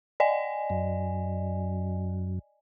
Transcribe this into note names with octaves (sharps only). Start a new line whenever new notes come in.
D5 D#5 G#5
F#2